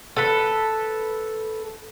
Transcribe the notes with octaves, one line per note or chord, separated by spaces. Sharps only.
A4 B4